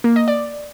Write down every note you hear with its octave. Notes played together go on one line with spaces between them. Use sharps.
A#3
D#5
D5